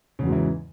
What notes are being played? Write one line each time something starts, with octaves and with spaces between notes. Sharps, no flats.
E2 G#2 C#3 E3 F#3